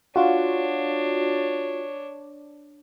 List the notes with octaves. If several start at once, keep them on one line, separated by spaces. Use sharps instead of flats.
D4 F4 F#4 C#5